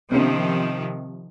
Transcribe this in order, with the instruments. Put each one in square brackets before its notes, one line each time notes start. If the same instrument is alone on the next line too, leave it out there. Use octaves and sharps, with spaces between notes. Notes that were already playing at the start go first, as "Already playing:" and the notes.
[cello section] C3 D#3 F3 [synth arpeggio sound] B3 C#4